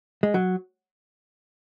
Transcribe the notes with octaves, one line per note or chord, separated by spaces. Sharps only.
G#3
F#3